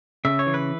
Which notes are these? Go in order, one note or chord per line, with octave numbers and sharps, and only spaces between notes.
C#3 E5
C#5
E3
B4